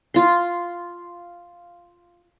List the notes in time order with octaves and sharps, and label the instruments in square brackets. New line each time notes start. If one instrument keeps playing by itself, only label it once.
[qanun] F4 C6